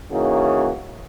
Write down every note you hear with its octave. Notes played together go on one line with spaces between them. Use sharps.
C#3 E3 A#3 D#4 F#4